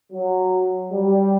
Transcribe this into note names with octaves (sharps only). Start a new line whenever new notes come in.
F#3
G3